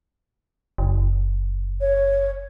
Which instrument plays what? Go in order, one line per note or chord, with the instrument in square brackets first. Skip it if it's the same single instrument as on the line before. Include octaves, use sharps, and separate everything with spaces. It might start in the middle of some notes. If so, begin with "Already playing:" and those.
[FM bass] F#1
[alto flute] C#5